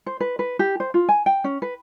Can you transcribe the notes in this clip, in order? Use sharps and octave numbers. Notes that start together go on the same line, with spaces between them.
C5
B4
B4
G4
C5
F4
G#5
G5
C#4
B4